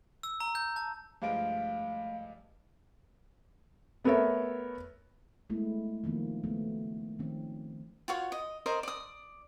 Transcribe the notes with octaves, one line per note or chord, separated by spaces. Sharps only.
E6
A#5
G6
A5
G2 F3 G#3 A3 F5 D7
A3 B3 A4 A#4 C#5 E5
G#3 A3 B3 E4
D#3 F3 A#3 C4
C#3 F#3 A3 B3
D#3 F3 C4 C#4
F4 F#4 C#5
D#5
A#4 C5 D5 D#5
D5 D#6